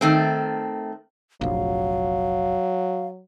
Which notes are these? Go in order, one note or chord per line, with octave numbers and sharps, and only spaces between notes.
D#3 A3 C4
F1 A#1 F#3 F5